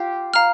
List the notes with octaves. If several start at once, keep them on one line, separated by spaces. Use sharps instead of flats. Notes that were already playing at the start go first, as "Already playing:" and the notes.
Already playing: F4 G4
F5 A#5 F6